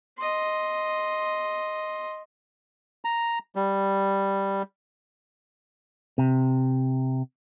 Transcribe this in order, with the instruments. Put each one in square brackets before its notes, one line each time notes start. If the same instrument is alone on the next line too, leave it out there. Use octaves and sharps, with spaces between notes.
[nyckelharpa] D#5 C6
[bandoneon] A#5
G3
[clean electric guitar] C3